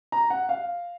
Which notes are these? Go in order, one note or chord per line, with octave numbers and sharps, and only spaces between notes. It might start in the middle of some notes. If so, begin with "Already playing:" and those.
A#5
F#5
F5